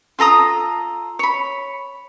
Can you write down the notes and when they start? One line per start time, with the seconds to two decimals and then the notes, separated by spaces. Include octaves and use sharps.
0.19 F4 A4 A#5 D#6
1.19 C#5 B5